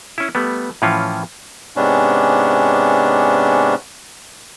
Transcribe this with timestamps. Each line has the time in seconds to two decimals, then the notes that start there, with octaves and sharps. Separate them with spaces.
0.18 C#4 E4
0.35 G3 A3 B3
0.82 A2 E3 F3 C#4 F4
1.76 G#2 C3 B3 C#4 D4